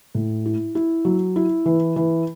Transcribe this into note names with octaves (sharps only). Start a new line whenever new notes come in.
A2
E4
E4
F#3
E4
E3
E3